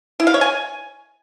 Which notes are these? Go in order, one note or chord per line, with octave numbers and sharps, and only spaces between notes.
E4
F5
C#5
G#5